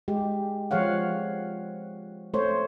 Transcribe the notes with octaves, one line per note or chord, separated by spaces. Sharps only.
G#3 G4
F3 G#3 C#5 F5 F#5
A3 C5 C#5